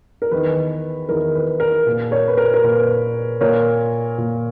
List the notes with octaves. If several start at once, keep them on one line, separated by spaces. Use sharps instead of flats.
A#4
E2 D#3 B4
E2 D#3 A#4
B4
A#4
A#2
A#4 C#5
B4
A#4
A#4
A#2 B4
A#2 A#4 C#5
A#2